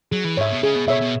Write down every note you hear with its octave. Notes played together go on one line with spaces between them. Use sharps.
F#3 G#4
E3
G#2 C#5 E5
B2
C#3 G#4
B2
B2 C#5 E5
B2